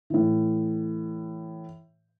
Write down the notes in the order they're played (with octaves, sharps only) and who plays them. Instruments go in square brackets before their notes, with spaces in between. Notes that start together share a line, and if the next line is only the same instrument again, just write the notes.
[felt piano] A2 E3